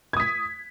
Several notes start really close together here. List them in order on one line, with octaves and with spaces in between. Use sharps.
G#6 D#6 B6